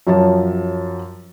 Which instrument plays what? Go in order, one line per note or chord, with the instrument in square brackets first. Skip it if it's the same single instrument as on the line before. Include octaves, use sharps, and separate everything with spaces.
[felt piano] F#2 F3 C#5 A5